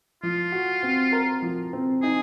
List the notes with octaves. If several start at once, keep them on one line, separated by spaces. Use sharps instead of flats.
F3 F4
F#4
C4
A#4
F3
C4
D#4 G#4